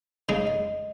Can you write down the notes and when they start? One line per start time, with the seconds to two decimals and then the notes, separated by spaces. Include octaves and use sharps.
0.28 C#3 G#3 D#4 D#5
0.46 D#5